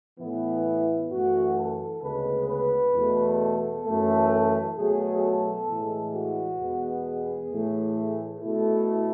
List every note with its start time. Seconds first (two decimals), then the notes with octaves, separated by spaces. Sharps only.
0.20 A2 E3 B3 E4
1.10 F#2 E3 A3 F#4
1.56 A4
2.02 D2 C#3 G#3 B3 B4
2.48 B4
2.94 E2 B2 A3
3.40 A4
3.84 F#2 E3 A3
4.76 B2 F#3 A3 G#4
5.22 A4
5.67 A2 E3 G#3
6.13 F#4
6.58 E2 B2 G#3 B3
7.05 G#4
7.50 A2 E3 A3
8.40 B2 A3 E4